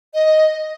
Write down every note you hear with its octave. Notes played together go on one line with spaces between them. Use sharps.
D#5